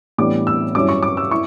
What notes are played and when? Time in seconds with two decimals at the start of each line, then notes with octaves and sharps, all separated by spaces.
0.18 A2 E3 G3 B3 D4 D6
0.47 E6
0.75 G2 F#3 C#4 E4 D6
0.89 C#6
1.03 D6
1.17 E6
1.31 E4 C#6